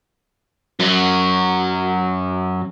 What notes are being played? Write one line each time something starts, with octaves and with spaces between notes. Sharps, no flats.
F#2 F#3